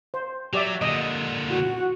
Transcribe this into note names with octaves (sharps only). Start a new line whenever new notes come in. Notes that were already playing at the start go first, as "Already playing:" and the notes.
C5
F#3 G4 D5 E5
A#2 D3 D#5
F#4